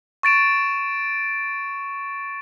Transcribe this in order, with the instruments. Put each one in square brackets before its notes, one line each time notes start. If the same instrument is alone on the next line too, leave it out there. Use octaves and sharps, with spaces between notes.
[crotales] C#6 A6 D7 E7